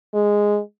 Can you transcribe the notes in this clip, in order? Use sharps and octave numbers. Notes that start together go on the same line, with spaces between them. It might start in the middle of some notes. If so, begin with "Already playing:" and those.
G#3